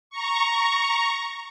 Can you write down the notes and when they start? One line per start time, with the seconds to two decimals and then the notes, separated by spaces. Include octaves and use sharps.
0.10 A#5 C#6